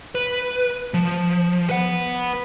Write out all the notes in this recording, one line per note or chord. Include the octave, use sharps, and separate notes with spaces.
B4
F3
B4 F#5